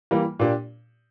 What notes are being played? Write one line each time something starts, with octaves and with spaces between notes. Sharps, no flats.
E3 G3 A#3
A#2 A#3 D4 G4